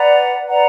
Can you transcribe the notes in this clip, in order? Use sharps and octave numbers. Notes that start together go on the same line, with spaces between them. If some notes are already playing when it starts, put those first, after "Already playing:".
Already playing: B4 D5 F#5 A#5
B4 D5 F#5 A#5